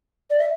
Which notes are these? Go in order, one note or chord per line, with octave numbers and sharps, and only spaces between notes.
D5
E5